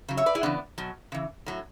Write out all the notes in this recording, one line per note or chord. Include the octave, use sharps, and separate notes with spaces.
C#3 F#3
C#5 E5
B4 D5
E4 G#4
C#3 E3 B3 D4
B2 F#3
C#3 E3
A2 F#3